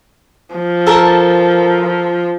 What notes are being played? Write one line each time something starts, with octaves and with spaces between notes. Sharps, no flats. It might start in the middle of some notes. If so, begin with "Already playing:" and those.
F3
A4 A#4 A5